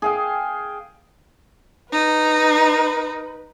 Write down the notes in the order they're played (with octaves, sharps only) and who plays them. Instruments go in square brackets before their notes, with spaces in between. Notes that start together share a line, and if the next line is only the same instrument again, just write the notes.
[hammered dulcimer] G#4 F5 G5
[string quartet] D#4 [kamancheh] B4